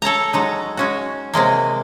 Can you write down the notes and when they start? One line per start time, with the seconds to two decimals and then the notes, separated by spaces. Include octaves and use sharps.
0.02 A4 C#5 A5 A#5
0.33 F#3 G#3 D#4
0.77 G#3 C#4 F#4
1.34 C3 F#3 G#3 A#3